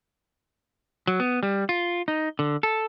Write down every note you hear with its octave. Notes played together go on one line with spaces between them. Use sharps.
F#3
B3
G3
F4
D#4
D3
A4